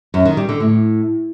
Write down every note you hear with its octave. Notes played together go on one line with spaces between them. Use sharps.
F#2
D#3
G3
D3
A2